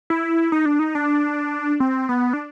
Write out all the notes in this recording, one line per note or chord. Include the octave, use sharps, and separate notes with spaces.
E4
D#4
D4
D#4
D4
C4
B3
D4